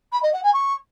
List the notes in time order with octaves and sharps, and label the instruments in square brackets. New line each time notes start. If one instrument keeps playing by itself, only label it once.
[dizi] B5
D#5
F#5
G#5
C#6